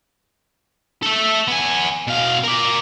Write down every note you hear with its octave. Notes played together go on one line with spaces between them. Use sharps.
A4 E5
B3 G#5
B2 F5
A#4 D5